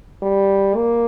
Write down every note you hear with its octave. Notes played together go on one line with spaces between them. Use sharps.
G3
A#3